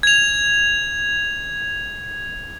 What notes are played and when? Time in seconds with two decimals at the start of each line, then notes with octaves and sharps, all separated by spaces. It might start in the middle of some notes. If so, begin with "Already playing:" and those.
0.03 G#6 F7